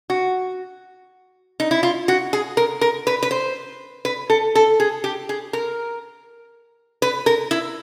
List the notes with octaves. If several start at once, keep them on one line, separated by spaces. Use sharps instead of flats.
F#4
D#4
E4
F4
F#4
G#4
A#4
A#4
B4
B4
C5
B4
A4
A4
G#4
G4
G#4
A#4
B4
A#4
E4